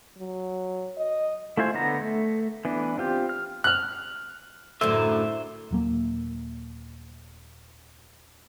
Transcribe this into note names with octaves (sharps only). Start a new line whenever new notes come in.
F#3
D#5
A3 E4 F4 C5 G#5
D3 B3 A#5
A3
E3 B3 D4
C4 F4 G4
F6
F6 F#6
F#2 A2 D3 C5 E5
D#1 F#3 A#3